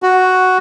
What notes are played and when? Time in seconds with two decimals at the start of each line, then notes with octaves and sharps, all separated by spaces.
0.03 F#4